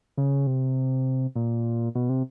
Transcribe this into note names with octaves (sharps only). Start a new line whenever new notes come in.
C#3
C3
A#2
B2
C3